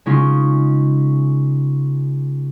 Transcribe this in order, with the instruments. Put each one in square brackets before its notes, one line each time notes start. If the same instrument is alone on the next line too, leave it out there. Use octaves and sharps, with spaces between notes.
[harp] C#3 G#3 C#4 D#4 F4